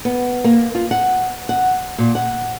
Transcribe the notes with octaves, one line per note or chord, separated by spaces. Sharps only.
B3
A#3
F4
F#5
F#5
A#2
F#5